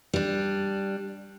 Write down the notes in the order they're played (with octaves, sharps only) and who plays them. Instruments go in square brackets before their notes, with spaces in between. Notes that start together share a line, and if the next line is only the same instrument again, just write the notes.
[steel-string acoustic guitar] G3 D4